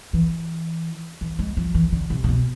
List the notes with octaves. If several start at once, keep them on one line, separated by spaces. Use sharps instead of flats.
E3
E3
G#3
F3
E3
D3
C3
C3
B2